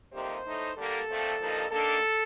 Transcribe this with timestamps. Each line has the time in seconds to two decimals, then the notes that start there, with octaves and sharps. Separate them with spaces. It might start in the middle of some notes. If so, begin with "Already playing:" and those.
0.13 F2 C3 G3 A#3 D#4 C5
0.44 A2 A3 D#4
0.76 D3 G3 A#3 A4
1.08 A#2 F3 A3 C4
1.39 G2 F3 A#3 D#4
1.71 D#3 A#3 D4 A4